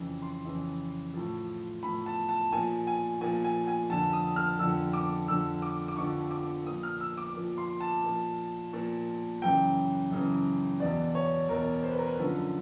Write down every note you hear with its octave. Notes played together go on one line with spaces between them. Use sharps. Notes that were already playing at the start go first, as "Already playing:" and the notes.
Already playing: F2 C#3 E3
C6
F2 C#3 E3
A2 F3
A2 F3 B5
A5
A5
A#2 F3 G#5
G#5
A#2 F3 G#5
G#5
G#5
F2 D3 F3 A5
D#6
F6
F2 D3 F3 E6
D6
F2 D3 F3 E6
D6
D6
F2 D3 F3 C#6
D6
A#2 F3 D#6
F6
E6
D6
A#2 F3
C6
A5
A#2 F3
A#2 F3
F#2 C#3 E3 G5
F#2 C#3 E3
E2 B2 D5
C#5
E2 B2 A#4
C5
B4
A#4
B4
F#2 D3 F3 B4